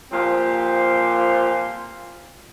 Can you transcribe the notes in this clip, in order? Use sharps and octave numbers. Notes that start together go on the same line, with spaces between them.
A#2 F3 C4 F4 G4